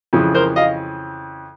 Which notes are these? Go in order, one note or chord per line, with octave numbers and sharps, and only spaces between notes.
F2 C#3 E3
A#4 C5
D#5 F5